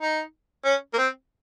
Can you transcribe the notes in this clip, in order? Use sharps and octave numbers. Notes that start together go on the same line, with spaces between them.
D#4
C#4
A#3
C4